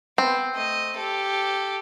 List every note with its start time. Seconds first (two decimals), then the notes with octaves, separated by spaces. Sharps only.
0.18 B3 C4
0.54 A3 D#5
0.97 G4 A4